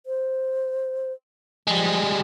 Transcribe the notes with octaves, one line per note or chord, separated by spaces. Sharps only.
C5
F3 G3 G#3